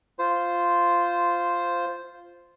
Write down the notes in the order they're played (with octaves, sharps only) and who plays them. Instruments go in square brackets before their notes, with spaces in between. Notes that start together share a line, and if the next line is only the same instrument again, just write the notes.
[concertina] F4 C5